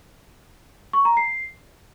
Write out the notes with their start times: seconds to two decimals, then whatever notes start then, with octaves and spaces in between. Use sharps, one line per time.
0.93 C#6
1.05 A#5
1.17 C7